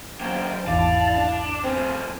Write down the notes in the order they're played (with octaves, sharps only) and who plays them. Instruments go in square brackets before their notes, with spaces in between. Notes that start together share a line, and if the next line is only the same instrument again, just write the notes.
[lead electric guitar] F#3 A#3 [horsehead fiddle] C5 G5
[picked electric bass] G#1 E2 [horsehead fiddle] E4 A5 [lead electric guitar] D5 [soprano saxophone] F5
[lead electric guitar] D4
[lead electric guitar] G2 F3 [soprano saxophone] C4 [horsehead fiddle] C5 G#5